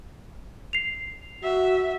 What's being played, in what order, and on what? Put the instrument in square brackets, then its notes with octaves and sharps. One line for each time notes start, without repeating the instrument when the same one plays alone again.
[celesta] C7 F7
[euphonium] F#4 [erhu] E5